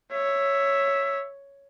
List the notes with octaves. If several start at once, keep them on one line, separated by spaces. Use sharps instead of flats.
C#5 E5